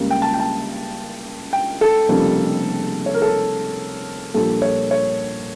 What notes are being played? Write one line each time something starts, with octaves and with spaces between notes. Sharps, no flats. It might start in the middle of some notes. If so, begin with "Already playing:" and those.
Already playing: C#2 C#3 G3 A#3
G5
A5
G5
A5
G5
A4
F1 F2 C#3 G3 A#3
C#5
A#4
A4
A#1 A#2 G3 A#3 A4
C#5
C#5